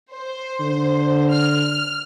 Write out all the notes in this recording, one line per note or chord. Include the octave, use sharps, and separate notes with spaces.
C5
D3
F6